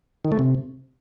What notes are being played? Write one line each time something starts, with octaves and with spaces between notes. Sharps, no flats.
D#3
A3
C3